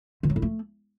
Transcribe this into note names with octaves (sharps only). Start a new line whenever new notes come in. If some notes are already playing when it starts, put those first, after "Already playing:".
D#3
F#3
E4
A3